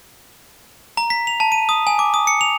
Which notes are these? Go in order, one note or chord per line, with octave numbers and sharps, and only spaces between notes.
A#5
B6
F7
A5
D#7
D#6
G#5
D6
D#6
C#7
F7